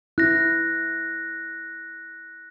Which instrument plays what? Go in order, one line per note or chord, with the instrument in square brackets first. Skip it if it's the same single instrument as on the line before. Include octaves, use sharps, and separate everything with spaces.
[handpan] E4 [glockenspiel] F#6 A#6